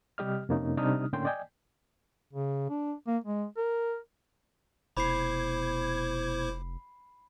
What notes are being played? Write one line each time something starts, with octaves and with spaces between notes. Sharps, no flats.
C3 G3 G4 D#5 F6
F2 C3 A#3 C#4 D#4
C3 G3 D4 D#4 D#6 F6
A2 D3 A#3 C#4 G5 C6
D5 D#5 G5 G#5
C#3
D4
A#3
G#3
A#4
F1 B2 E4 C5 B5 D6 G#6 C7